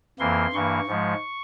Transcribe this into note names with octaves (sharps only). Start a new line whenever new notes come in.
F2 E3 A#3 C6
G2 E3 A#3 C#6
G#2 F3 G#3